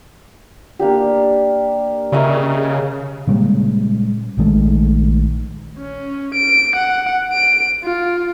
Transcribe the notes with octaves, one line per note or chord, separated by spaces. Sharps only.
A#3 D4 G4
C#3 A#4 D#5 E5
A#2 C#3 G3 G#3
A#1 D#3 G#3 A3
C#4
D7
F#5
D7
F4